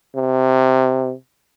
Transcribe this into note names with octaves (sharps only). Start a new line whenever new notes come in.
C3